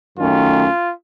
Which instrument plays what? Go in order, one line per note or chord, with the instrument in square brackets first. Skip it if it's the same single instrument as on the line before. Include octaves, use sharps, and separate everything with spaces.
[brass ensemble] F#2 D#3 A3 C#4 F4